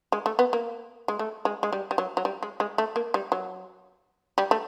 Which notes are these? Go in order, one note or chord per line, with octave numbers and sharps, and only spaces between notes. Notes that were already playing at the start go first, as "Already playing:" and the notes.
G#3
A3
B3
A#3
G#3
A3
G#3
G#3
G3
G3
F#3
F#3
G3
G#3
G#3
A3
A#3
G3
F#3
G3
A3